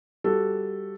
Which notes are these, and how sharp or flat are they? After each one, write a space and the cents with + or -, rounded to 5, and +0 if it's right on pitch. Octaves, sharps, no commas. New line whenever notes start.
G3 +0 F#4 +0 A4 +0